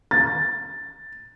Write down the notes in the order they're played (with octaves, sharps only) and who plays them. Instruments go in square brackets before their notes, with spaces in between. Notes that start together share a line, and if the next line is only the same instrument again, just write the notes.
[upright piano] A6